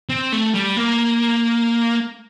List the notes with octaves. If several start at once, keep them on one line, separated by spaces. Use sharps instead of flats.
C4
A3
G3
A#3